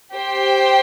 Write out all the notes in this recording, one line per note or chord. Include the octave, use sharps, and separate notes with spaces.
G4 C5 G5